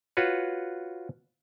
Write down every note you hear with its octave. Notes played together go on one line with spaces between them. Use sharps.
F4 F#4 B4 C#5